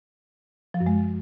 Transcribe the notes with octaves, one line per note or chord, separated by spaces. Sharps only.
F3
F#2
G#3